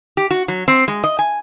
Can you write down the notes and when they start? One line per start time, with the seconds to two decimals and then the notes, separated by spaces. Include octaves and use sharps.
0.17 G4
0.30 F#4
0.48 F#3
0.68 C4
0.88 G#3
1.04 D#5
1.19 G#5